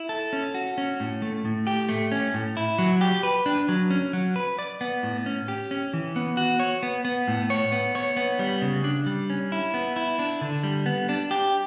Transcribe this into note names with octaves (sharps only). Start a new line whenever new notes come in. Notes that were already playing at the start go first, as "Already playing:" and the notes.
Already playing: E4
A4
C#4
F#4
C#4
A2
A3
A2
G4
A3
C#4
A2
E4
F#3
G4
B4
D4
F#3
C#4
F#3
B4
D5
B3
A2
C#4
G4
C#4
E3
B3
F#4
C#5
B3
B3
A2
C#5
B3
C#5
B3
G3
C#3
D4
G3
C#4
E4
B3
E4
D4
D3
G3
B3
D4
G4